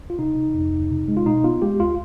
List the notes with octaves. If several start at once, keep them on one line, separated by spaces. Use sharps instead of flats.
F4
C3 D#4
C3
F2
D2
C3
G#3
F4
B2 D#4
B3 F4
G#3 G4
D2 F4